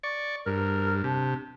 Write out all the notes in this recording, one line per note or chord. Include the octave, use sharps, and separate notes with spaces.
D5 C#6
G2 A#4
C3 D4